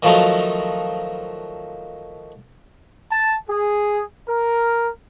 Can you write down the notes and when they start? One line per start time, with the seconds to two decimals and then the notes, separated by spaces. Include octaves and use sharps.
0.03 D#3 F3 F#3 A3 D#4
3.12 A5
3.49 G#4
4.28 A#4